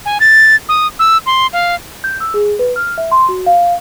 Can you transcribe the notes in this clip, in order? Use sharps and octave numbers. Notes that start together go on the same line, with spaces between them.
G#5
A6
D#6
E6
C6
F5
G6
E6
G#4
B4
F6
E5
C6
F#4
F5